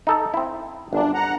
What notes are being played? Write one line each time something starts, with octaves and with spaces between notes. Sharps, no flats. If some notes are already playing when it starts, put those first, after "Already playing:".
D#4 A4 A#5
C4 E4
G1 F#2 D4
F#5 A#5